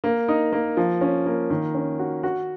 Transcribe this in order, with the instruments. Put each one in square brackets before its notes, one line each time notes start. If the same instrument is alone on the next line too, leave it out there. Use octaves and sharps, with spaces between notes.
[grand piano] A#3
D#4
A#3
F3
C#4
A#3
D#3
C#4
F#4
F#4